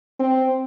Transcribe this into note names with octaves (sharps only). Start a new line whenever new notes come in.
C4